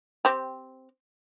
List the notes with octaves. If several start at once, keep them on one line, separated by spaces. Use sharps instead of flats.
C4 G4